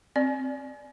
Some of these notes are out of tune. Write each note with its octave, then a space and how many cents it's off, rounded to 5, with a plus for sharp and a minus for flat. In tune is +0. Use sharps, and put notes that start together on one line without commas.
C4 +0 D5 +0